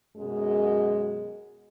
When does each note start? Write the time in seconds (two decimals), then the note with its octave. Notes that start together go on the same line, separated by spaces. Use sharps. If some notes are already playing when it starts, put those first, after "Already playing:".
0.17 F#2 B2 G#3